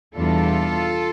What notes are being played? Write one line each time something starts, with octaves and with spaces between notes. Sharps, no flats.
E2 B2 G3 D4 F4 A4